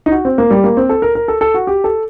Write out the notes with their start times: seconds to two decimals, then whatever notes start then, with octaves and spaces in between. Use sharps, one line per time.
0.06 D#4
0.11 F#4
0.25 C4
0.38 A#3
0.50 G3
0.64 A#3
0.77 C4
0.89 A4
1.02 A#4
1.15 A#4
1.28 A4
1.41 A4
1.54 F#4
1.67 G4
1.84 A4